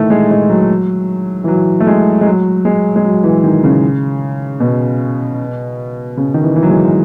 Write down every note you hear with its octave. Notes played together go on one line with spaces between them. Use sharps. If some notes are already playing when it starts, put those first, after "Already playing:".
Already playing: D#3 E3 A3
G#3
G#3
F#3
E3
F#3
A3
G#3
G#3
F#3
G#3
G#3
F#3
E3
D#3
C#3
B2
C#3
D#3
E3
E3
F#3
G#3